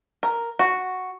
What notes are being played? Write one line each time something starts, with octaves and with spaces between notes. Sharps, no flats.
A#4
F#4